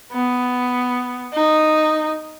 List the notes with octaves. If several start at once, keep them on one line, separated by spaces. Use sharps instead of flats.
B3
D#4